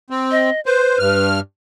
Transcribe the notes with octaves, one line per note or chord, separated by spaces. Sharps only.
C4
D#5
B4 C5
G2 F6